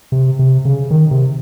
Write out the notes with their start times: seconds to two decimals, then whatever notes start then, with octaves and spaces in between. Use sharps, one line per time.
0.12 C3
0.39 C3
0.65 C#3
0.91 D#3
1.11 C3